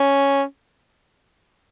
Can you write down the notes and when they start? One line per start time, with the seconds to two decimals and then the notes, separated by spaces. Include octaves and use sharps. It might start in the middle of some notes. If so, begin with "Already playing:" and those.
Already playing: C#4